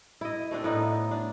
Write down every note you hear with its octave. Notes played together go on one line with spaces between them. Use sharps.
E4 D#5
A3 C4 D4
A2 B3 D#4
D4